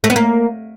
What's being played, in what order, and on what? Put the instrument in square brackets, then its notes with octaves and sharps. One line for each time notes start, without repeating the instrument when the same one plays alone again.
[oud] A3
B3
A#3